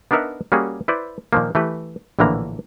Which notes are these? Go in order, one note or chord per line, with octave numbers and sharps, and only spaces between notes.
B3 D4 D#4 A#4 E5 F#5
G3 A#3 C#4 F#4 G#4
E4 B4 C5 D5
A#2 D#3 F3 A#3
E3 A3 G4 B4
A#1 A2 D3 E3 A#3 A#5